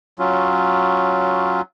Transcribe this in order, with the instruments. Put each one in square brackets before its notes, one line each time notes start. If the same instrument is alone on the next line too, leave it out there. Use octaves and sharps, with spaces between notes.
[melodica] F#3 C#4 F4